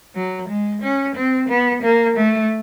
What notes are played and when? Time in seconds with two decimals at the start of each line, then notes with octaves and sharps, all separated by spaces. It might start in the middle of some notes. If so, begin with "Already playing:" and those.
0.15 F#3
0.49 G#3
0.82 C#4
1.15 C4
1.49 B3
1.83 A#3
2.17 A3